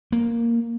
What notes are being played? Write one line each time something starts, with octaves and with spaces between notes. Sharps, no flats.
A#3